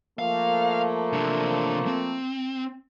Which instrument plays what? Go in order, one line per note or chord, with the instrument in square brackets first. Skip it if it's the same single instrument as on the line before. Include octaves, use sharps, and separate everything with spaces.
[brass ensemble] F3 A3 A#3 [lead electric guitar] F5
[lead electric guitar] C3 D4
C4